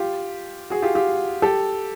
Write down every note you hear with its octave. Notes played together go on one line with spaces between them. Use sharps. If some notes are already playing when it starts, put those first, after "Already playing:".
Already playing: F4 G4
F#4 G#4
F4 G4
F4 G4
G4 A4